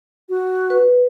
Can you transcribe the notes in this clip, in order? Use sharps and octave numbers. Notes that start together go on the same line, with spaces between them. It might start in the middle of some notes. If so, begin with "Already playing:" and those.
F#4
B4